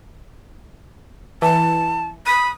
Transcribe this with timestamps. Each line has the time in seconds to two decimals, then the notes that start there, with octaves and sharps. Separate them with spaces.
1.42 E3 A5
2.26 B5 D#6